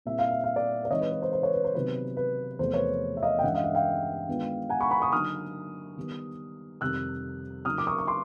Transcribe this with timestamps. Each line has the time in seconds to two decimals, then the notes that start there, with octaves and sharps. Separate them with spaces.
0.05 A#2 G3 C4 E4 E5
0.19 F5
0.31 E5
0.44 F5
0.56 D5 E5
0.85 D5
0.90 E3 G#3 C4 D#4 C#5 D#5
1.01 B4
1.11 B4
1.22 C5
1.33 C5
1.43 B4 C#5
1.54 B4
1.64 C5
1.75 C3 D#3 F#3 B3 D#4 B4
2.17 B4
2.59 E2 C3 F3 A3 C5
2.73 B4 C#5
3.17 E5
3.23 D#5 F5
3.39 G5
3.43 G2 E3 G#3 C#4 E5 F#5
3.54 D#5 F5
3.64 E5 F#5
3.75 F5 G5
4.29 D#3 G#3 B3 D4 F4
4.69 F#5 G#5
4.80 B5 C#6
4.91 B5 C#6
5.02 C#6 D#6
5.12 D3 F#3 A#3 D#4 D#6 F6
5.97 D#3 G3 B3
6.81 F2 C3 D#3 G3 C4 E6 F#6
7.65 C#3 F#3 A#3 D#4 D#6 F6
7.78 D6
7.87 C#6 D#6
7.98 C#6
8.07 C6 D6